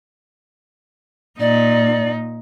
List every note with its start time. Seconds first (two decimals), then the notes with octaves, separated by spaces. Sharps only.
1.40 A#2 D#4 D5